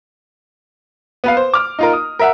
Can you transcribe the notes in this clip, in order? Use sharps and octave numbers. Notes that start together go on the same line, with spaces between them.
B3 B4 F5
C5
D6 F6
D#4 F4 A#4
D#6
A#4 E5 F#5